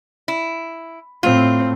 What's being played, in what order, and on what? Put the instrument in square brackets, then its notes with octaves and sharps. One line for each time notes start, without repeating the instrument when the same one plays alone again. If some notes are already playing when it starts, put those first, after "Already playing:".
[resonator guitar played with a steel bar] E4
[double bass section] A2 [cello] C4 [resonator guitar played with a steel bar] F4